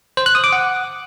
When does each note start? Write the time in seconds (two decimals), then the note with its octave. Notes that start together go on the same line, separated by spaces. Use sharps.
0.17 C5
0.26 F#6
0.35 D#6
0.44 D6
0.53 F#5